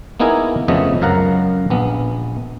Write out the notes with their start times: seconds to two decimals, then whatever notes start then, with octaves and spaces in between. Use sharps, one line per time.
0.20 A#3 B3 D#4 E4 G#4 A#4
0.68 F2 C#3 A3 B3 D#5
1.01 C#2 F#2 A#4 F5 F#5 A#5
1.70 A#1 B3